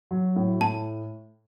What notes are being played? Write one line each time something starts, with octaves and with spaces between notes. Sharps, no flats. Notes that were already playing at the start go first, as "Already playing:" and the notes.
F#3
A2
A2 A5